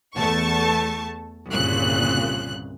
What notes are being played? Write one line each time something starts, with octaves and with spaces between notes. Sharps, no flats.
E2 A3 A5 C#6
G1 C2 A#2 C#3 F#6